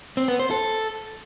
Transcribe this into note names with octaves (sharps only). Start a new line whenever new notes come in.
C4
B3
C5
A4